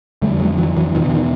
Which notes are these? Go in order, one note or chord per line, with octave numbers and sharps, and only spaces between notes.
F2 D3 G3 A3
F#3 G#3
E3 F#3
E3 F#3
E2 B2 D#3 F3
D3 E3
D#3